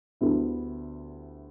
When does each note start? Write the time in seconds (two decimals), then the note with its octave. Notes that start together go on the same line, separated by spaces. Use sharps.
0.21 D2 D3 G3 B3 E4